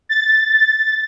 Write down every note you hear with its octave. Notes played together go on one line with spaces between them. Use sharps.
A6